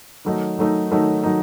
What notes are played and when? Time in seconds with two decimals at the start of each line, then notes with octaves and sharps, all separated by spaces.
0.25 D#3 F#3 A3 D#4
0.59 D#3 F#3 A3 D#4
0.92 D#3 F#3 A3 D#4
1.23 D#3 F#3 A3 D#4